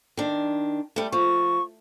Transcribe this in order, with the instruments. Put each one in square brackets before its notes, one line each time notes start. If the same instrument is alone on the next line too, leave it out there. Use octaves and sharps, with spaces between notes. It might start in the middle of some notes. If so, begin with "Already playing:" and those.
[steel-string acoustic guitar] D#3 D4
G3 A3
[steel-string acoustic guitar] F3 [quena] C#6